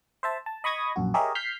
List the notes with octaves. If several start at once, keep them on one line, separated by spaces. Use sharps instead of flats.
C5 E5 A5
A5
D#5 B5 C#6 D#6 G#6 A#6
A#1 F#2 F#4
G4 G#4 A#4 C#5 D#5 E5
F6 G6 B6 C7